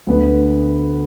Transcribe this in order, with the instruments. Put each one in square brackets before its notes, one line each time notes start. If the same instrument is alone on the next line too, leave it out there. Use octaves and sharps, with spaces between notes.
[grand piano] D2 D3 B3 D4 B4